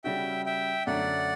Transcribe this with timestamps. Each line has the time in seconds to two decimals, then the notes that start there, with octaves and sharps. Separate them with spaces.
0.04 C#3 G3 C#4 F#4 E5 G5
0.46 E5 G5
0.87 F#2 D3 A3 C#4 D5 F#5